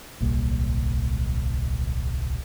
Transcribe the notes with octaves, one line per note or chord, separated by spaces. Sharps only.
D1 B1 G3 A#3